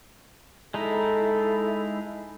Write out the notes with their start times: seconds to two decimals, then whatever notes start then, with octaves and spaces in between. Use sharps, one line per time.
0.74 G#3 D#4 E4 A4